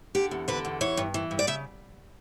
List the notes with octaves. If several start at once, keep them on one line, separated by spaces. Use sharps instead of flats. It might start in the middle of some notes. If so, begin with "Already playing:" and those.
D3 G4
E2
D3 B4
E2
E3 C#5
G2
E3
G2
D5
C#3 E5